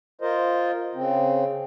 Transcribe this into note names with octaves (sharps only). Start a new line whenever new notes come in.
F4 A#4 C5 D#5
C#3 C4